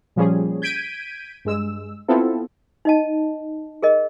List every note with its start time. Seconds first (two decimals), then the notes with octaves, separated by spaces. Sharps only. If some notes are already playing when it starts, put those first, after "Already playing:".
0.16 A#2 F3 G3 C#4 G#4
0.62 G6 G#6 B6 D7 D#7
1.45 G2 G#3 E6
2.08 B3 C4 E4 F4 A4
2.85 D#4 D#5 A5
3.83 G#4 A#4 D#5